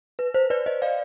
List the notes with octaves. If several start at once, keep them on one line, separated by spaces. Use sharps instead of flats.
B4
C5
B4 D5
C5 D#5
D5 F5